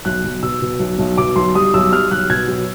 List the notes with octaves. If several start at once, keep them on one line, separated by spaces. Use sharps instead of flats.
B1 F#6
B1
B2 E6
B2
B1
B1
B2 D6
B1 C6
G3 D#6
B1 E6
G3 F6
B1 F#6
B2 G#6
F#3